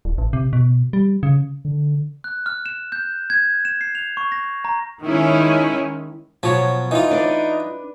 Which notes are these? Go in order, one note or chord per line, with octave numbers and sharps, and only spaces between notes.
D1
A1
C3
B2
G3
C#3
D3
F#6
F6
E7
G6
G#6
E7
C7
F7
C#6
A#6
A#5
D#3 G#3 C#4 D#4 E4
B2 F3 F#3 C#5
E3 D#4 F4
D4 B4 D5